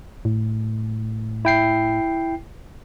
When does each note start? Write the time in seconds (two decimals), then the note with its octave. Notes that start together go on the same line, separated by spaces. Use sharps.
0.25 A2
1.45 E4 G5 C7